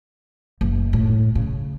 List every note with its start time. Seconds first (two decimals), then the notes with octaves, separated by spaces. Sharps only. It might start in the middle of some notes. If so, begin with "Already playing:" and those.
0.61 F#1
0.93 A2
1.35 C#3